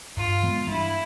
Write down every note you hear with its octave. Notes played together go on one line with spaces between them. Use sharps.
G2 F4
E3 G#3 B3
G2 E4